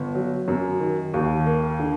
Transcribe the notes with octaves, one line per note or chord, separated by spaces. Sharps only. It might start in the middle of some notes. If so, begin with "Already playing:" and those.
Already playing: G1
F#3
F#2
D#3
D#2
A#3
D3